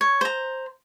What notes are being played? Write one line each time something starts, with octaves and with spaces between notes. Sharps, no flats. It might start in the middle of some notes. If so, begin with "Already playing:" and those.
C#5
C5 A#5